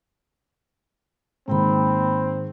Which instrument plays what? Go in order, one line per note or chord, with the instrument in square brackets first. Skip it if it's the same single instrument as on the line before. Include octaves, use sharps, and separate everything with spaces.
[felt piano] G#2 D#3 [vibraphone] A#3 G5 B5 [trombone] C4